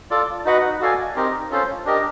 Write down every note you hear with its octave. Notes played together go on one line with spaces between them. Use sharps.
F4 A4 D5
D#4 F#4 B4 D#5 F#5
F#4 A4 D5 F5 G#5
C4 D#4 G4 A#4 D#5
C#4 F4 A4 C5
D4 G4 A#4 D#5